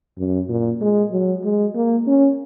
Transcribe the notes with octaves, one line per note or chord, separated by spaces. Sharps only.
F#2
A#2
G#3
F#3
G#3
A#3
C#4